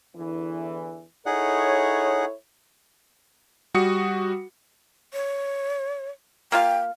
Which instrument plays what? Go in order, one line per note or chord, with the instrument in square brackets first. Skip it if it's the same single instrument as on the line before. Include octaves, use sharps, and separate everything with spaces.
[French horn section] E2 D3 E3
[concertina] D#4 G#4 F#5 [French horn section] E4 A4 C#5
[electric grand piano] G3 F#4 D#6 C#7
[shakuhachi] C#5
[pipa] A#3 F4 F5 [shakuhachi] G5